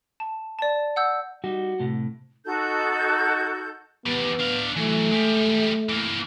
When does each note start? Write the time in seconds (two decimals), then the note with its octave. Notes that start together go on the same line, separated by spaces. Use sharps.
0.20 A5
0.59 D5 A5
0.96 F#5 D#6 E6 G6
1.44 G3 D#4 F#4
1.79 A2 C3 A3
2.45 D#4 F#4 A4 G6
4.06 E2 G3 B3
4.39 D4 F5
4.76 E3 F#3 A3
5.12 G#3 G4
5.89 E3 A#3